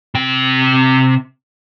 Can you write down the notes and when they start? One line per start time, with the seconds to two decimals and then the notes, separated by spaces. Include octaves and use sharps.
0.15 C3 G5